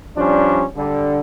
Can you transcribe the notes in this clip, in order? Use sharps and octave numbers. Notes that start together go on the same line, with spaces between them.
F3 G3 C#4 D4
D3 G3